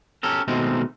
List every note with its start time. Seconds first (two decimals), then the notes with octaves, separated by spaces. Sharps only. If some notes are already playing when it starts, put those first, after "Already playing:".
0.23 C#4 G4 A4 A#4
0.48 B2 D#3 G#3 A3 C4